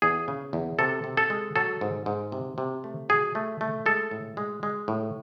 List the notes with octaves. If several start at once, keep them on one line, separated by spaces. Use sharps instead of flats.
E2 G#4
C#3
E2
C3 A4
C3
A4
G#3
F#3 A4
G#2
G#2
C3
C3
A3
F#3 G#4
A3
A3
G#3 A4
A2
G#3
G#3
A2